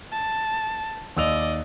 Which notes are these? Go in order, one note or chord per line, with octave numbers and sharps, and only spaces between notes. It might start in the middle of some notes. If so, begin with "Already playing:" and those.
A5
D#2 D5 D#5 E6 F7